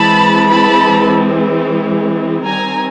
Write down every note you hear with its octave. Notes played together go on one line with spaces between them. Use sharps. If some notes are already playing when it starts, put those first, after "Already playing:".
Already playing: E3 G#3 C4 A5 B5
A5 B5
D#3 G3 C4 G#5 A#5